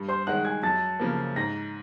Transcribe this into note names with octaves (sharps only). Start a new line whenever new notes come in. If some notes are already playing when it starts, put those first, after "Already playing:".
Already playing: G2
C5 C6
D#3 G#3 F#5 F#6
G#5 G#6
F#2 A5 A6
C#3 F3 A#3
G#2 A#5 A#6